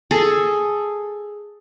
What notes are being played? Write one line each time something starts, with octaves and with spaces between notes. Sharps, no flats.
G#4 A4